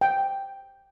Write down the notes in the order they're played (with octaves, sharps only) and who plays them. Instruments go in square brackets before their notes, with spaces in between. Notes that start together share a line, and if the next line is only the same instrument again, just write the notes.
[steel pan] G5